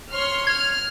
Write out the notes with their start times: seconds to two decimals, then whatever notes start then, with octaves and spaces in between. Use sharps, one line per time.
0.12 C#5 C6 F6
0.47 F6 G#6